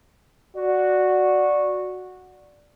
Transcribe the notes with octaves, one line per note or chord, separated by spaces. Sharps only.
F#4 D5